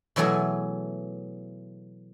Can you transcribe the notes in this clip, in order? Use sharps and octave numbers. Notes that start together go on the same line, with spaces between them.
B2 E3 F#3 A3 G#4